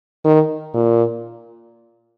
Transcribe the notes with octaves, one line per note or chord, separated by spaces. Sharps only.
D#3
A#2